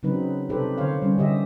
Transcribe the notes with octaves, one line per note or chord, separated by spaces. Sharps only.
C#3 F#3 C4 D#4 B4
C3 D#4 G4 A4 B4 C5
D3 C5 C#5 F5
G3 C#4
D3 G4 D#5 E5